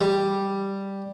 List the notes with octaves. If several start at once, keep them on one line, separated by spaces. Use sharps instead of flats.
G3